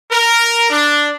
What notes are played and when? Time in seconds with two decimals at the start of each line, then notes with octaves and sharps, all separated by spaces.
0.11 A#4
0.70 D4